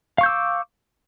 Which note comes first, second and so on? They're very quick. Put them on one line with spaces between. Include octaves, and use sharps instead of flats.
F5 C#6 G6 E6 D6